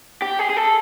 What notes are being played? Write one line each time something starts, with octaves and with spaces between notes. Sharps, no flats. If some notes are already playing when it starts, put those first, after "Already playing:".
G4
G#4
G#4
A4